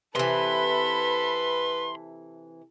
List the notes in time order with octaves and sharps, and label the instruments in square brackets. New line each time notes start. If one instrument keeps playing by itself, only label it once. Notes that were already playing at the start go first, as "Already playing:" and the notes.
[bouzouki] C3 E3 [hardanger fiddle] A4 B5 [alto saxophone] B4 [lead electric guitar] C6